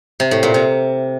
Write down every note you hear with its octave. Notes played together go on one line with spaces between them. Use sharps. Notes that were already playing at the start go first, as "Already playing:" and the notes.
C3
A2
A#2
C3